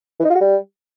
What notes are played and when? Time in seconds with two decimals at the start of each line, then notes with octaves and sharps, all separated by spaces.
0.19 E3
0.25 D#4
0.30 F4
0.35 F#4
0.41 G3